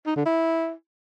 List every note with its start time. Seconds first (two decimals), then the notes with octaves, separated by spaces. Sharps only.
0.06 D#4
0.16 D3
0.26 E4